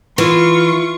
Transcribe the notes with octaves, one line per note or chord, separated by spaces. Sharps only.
E3 F4 C#6